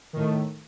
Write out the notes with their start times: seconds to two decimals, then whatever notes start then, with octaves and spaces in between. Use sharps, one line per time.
0.13 D#3
0.16 A2
0.19 A3